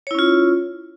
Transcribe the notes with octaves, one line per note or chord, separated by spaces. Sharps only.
C#4 E4 F4 C#5